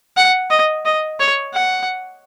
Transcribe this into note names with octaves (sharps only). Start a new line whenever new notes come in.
F#5
D#5
D#5
C#5
F#5